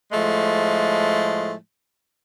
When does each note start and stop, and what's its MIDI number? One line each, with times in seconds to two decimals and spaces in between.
0.11 1.54 45
0.11 1.54 53
0.11 1.54 56
0.11 1.54 57